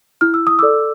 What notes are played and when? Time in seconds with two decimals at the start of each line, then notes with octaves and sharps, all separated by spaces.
0.21 E4 F6
0.34 E6
0.47 D#6
0.59 A4 D5 D6 E6